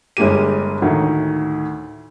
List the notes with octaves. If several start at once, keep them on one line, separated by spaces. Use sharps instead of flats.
G1 G#3 A#3 G4 D#7
D2 A2 D#3